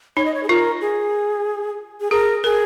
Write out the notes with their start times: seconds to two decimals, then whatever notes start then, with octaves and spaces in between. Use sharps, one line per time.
0.17 D#4 C#5
0.25 D#5
0.35 C#5
0.43 G#4
0.49 F4 A#4
0.81 G#4
2.01 G#4
2.11 G#4 A#4
2.44 G#4 A#4